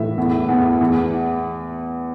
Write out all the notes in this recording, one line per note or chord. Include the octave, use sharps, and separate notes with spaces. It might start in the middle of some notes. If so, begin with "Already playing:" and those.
Already playing: A2 E3 E5
E2
E2
E2